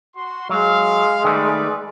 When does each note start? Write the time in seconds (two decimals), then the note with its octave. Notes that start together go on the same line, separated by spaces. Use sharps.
0.16 F#4 C6
0.49 F#3 G#3 F5
1.24 D#3 G3 A3 B4 D5